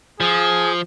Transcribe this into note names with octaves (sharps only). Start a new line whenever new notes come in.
F3 G#4